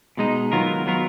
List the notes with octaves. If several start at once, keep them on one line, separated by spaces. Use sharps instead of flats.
B2 G#3 D#4
D#3 F#3 B3 F4 A#4
D#3 F#3 B3 F4 A#4